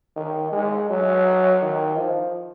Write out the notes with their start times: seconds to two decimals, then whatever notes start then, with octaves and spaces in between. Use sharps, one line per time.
0.16 D#3
0.52 G#3
0.90 F#3
1.62 D#3
1.98 F3